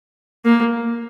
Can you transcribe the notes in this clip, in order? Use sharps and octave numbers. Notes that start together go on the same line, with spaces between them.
A#3